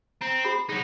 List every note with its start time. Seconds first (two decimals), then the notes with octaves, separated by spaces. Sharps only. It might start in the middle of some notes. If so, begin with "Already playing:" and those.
0.21 C4 A#5
0.44 F#4 G#4 B5
0.69 F#3 D#4 G#4 C#5